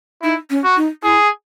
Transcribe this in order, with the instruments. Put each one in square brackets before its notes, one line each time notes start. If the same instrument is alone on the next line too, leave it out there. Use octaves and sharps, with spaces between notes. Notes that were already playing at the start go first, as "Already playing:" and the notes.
[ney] D#4 [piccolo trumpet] E4
[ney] C#4
[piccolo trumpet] F#4
[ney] D#4
[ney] E4 [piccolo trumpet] G#4